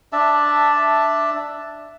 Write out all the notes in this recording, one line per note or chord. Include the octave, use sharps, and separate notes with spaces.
D4 E5 A5